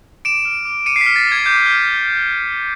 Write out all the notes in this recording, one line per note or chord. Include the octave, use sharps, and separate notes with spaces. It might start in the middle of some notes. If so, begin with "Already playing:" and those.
D6 D7 E7
F6
D6
D6 C#7 D#7
C7
B6
F6
A6
D6
G#6
D6 G6
F6